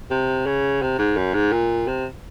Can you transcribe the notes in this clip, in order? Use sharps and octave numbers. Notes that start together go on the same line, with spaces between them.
C3
C#3
C3
G#2
F#2
G#2
A#2
C3